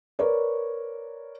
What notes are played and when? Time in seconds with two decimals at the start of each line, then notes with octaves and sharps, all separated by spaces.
0.19 A#4 B4 C#5 D5